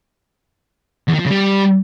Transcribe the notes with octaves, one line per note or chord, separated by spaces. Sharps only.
E2
D#3
F3
C#3
G3